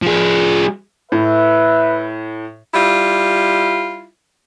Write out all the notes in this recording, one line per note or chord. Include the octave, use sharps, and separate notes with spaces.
F3 G#4
A2 B4 E5
G3 E4 F4